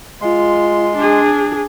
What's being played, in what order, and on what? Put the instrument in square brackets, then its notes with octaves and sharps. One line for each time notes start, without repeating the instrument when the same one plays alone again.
[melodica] G#3 C6 [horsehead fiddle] F4
[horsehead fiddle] D4 G#4